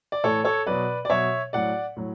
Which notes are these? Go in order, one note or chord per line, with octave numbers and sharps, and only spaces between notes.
D5
A2 E3 A4 C#5
A4 C#5
B2 F#3 B4 D5
D5
B2 F#3 C#5 E5
A2 F#3 D5 F#5
A2 F#3